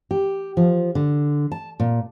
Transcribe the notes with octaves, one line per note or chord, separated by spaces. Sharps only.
G4
F3
D3
A5
A#2